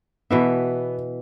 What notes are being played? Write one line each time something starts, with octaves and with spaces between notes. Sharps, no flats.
B2 E3 B3 E5